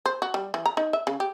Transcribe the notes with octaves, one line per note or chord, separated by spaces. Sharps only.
C5
F#4
G3
E3
A#5
D#4
E5
C#3
G4